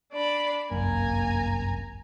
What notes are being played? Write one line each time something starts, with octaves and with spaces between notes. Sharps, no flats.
D4 D5 B5
G1 C2 F#2 A#3 G#5 A#5